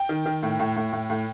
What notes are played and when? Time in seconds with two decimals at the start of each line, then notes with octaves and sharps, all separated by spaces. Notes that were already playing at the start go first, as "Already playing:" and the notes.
Already playing: G5
0.09 D#3
0.26 D#3
0.43 A2
0.59 A2
0.76 A2
0.92 A2
1.10 A2